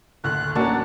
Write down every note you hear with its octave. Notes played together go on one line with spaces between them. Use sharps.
F#1 D2 A2 F#6
A1 F#3 A#3 C#4 D4 F#5 A5